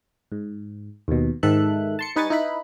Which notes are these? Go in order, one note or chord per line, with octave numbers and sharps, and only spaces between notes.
G#2
D#2 B2
G#2 D#3 A4 E5 F#6
A5 C6 C#7
G3 D#4 B4 G#5 C#6 A6
D#4 E4 B4 B5